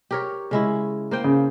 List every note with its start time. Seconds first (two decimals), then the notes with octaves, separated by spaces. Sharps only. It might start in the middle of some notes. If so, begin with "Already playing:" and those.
0.11 G4 A#4 C#5
0.51 C#3 G#3 E4
1.11 A#3 C5 G5
1.24 C#3